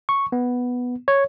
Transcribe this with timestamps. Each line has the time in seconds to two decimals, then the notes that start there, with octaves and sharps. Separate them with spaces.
0.09 C#6
0.32 B3
1.08 C#5